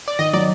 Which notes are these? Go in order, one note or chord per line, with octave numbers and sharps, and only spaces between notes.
D5
D#3 D#5
F#3 D5